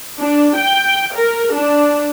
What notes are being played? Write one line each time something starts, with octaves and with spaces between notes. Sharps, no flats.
D4
G5
A#4
D4